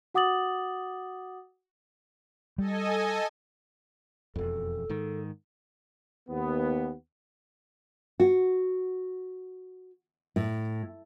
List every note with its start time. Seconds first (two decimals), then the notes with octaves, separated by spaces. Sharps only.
0.14 F#4 F#5 D6 D#6 A6 F#7
2.58 G3 A4 D#5 G#5
4.36 E1 F2 A4
4.90 G#2 D#3
6.29 D#2 B3
8.20 F#4
10.36 A2